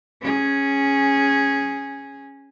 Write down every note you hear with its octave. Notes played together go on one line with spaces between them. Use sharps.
C#4 G#4